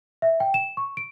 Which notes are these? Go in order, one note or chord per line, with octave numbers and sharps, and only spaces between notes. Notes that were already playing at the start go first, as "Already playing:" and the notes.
E5
G5
E7
C#6
D7